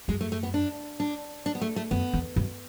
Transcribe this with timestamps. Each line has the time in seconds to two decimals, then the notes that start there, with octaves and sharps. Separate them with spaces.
0.08 F#2 G#3
0.21 A3
0.32 A3
0.43 B3
0.54 D4
1.00 D4
1.46 D4
1.55 B3
1.61 A3
1.76 A3
1.91 F#2 B3
2.14 E2
2.36 F#2